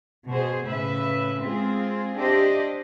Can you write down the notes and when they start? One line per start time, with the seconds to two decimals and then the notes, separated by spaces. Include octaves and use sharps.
0.28 B2 G#4 C5
0.65 A2 C#3 B4 E5
1.43 G#3 C4 F4 G#4
2.17 D4 G4 C5 D#5 E5